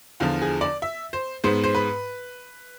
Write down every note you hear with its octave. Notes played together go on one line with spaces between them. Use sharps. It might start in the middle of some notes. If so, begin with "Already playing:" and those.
E2 D3 F3 F4
G#4
D5
E5
C5
G#2 G#3 B3 C5
C5
B4